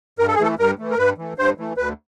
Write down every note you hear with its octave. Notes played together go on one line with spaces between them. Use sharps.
G2 A#4
A4
G#4
E3 A3 A4
G2 A#4
E3 A3
A#4
G2 B4
E3 A3
G2 C5
E3 A3
D2 B4